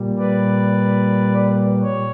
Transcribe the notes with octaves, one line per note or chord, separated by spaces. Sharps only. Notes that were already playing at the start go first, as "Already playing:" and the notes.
Already playing: A#2 G3
B4 D5
C#5